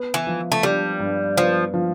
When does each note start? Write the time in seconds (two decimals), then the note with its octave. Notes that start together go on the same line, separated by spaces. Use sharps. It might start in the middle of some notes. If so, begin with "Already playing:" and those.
Already playing: B3
0.14 E3
0.27 F3
0.52 A3
0.63 G3 D4
1.00 G2
1.37 F3 B3
1.74 F3